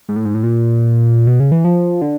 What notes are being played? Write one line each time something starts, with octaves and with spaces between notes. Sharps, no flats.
G#2
A2
G#2
A2
A#2
B2
C#3
E3
F3
D3